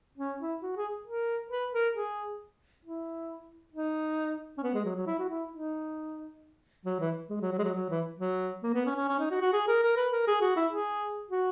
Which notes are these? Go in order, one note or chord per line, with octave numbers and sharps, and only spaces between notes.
C#4
E4
F#4
G#4
A#4
B4
A#4
G#4
E4
D#4
C#4
B3
G#3
F#3
F#3
E4
F#4
E4
D#4
F#3
E3
G#3
F#3
F#3
G#3
F#3
F#3
E3
F#3
A#3
B3
C#4
C#4
C#4
D#4
F#4
F#4
G#4
A#4
A#4
B4
A#4
G#4
F#4
E4
G#4
F#4